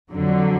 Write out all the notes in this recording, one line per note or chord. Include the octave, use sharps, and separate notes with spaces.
F2 D3 F#3